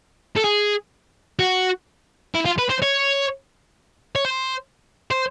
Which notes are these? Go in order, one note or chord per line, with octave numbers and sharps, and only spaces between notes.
A4
G#4
F#4
E4
F4
B4
C5
C#5
C#5
C5
C5